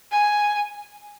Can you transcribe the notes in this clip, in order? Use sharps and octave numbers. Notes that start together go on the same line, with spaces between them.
G#5